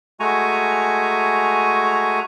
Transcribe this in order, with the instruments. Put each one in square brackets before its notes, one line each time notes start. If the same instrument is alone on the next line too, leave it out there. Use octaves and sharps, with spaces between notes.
[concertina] G#3 A3 F#4 G#5 A#5 C#6